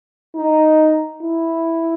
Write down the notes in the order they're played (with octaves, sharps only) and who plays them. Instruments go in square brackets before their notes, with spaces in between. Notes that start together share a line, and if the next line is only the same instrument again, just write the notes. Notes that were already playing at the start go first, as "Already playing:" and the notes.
[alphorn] D#4
E4